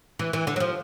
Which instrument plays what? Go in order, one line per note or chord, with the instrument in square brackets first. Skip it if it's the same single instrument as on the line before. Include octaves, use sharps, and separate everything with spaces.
[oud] E3
E3
D3
F#3
F3